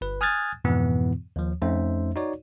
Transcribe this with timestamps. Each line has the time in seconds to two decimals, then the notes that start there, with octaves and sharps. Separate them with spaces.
0.01 G1 B4
0.21 G#5 D#6 F6 F#6 G#6 A6
0.64 F2 G#2 B2 E3 B3 E4
1.36 D#2 F3
1.62 F2 A3 C#4 D#4 C5 E5
2.16 D#4 F#4 C#5 D5